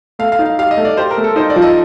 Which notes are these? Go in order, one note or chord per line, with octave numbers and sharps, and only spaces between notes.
A3 F5
F5
D#4
F5
G4 F5
D#5
A3
D5
G4 C5
A#4
A3
A4
D#4 C5
D5
F3
D#5